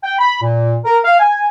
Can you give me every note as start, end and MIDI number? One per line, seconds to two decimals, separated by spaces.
0.04 0.15 79
0.19 0.40 83
0.41 0.77 46
0.85 0.97 70
1.04 1.19 77
1.19 1.46 80